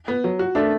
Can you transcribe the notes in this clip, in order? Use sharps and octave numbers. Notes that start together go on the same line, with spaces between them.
B3
F#3
F#4
A3 D4